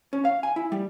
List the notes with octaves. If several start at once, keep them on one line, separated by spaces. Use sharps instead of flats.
C#4
F5
G#5
E4
G3